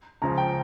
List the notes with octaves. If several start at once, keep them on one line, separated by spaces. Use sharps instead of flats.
C#2 C#3 F3 A#5
G5